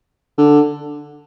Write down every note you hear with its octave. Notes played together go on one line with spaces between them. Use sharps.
D3